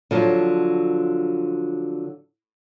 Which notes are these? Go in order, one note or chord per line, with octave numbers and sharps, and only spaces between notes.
D3 F3 F#3